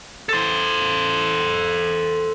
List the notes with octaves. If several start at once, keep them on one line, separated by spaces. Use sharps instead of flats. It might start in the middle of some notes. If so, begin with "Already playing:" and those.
A4 C5